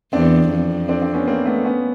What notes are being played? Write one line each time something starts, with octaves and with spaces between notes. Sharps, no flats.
E2 C4 D4
F2
C4 D4
C4 D4
B3 C#4
A#3 C4
A3 B3
B3 C#4